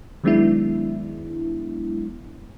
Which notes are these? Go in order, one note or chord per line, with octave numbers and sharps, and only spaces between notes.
D#3 F#3 G#3 B3 D4 E4